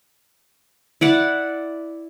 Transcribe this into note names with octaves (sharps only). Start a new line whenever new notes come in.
E4 D5 F#5